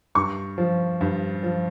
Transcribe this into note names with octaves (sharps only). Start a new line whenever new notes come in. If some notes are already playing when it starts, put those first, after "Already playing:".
G2 C#6
F3
G2
F3